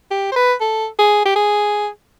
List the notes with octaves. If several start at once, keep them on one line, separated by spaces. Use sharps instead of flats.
G4
C5
B4
A4
G#4
G4
G#4